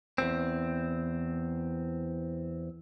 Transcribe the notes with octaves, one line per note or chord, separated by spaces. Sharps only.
E2 G#2 C4